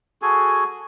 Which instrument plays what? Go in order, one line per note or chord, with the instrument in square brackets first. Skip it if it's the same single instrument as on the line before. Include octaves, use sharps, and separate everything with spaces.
[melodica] F#4 G#4 A4 G#5